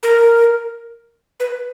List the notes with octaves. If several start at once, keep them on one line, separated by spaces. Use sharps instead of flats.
A#4
B4